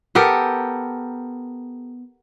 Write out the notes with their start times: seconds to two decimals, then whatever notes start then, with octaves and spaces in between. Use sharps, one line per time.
0.15 B3 G4 A4 A#4